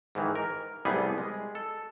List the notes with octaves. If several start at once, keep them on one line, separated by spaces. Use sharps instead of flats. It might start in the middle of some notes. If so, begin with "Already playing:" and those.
G#2 D#3 E3
A#4
C2 G3 A3 B3 G#4
G#3
A4